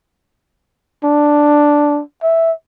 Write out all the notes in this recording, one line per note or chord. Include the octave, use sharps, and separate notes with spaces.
D4
E5